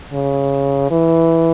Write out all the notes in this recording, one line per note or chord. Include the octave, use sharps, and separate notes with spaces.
C#3
E3